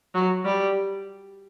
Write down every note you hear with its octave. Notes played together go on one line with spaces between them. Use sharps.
F#3
G3